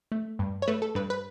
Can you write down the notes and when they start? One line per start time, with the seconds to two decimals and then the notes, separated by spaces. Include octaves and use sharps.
0.12 A3
0.39 G2
0.62 C#5
0.68 A3 B4
0.82 A4
0.95 G2 B4
1.10 B4